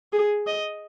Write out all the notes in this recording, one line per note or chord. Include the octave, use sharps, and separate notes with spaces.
G#4
D#5